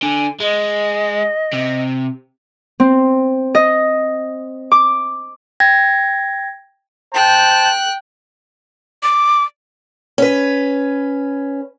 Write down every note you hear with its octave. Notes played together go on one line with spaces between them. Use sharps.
D3 G#5
G#3 D#5
C3
C4
D#5
D6
G5 G#6 A#6
C5 G5 A5 F#6
D6
C#4 B4